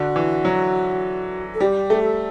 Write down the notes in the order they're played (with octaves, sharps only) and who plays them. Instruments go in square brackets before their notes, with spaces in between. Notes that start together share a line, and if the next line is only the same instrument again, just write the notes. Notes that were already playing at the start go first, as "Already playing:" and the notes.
Already playing: [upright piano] D3 [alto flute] F#4
[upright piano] E3
F#3
[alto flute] A4
[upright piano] G3 [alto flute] G4
[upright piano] A3
[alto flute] A4